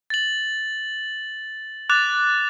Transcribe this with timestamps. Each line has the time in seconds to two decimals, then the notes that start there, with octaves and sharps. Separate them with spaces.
0.10 A6 F#7
1.90 D6 F#6 A6 F7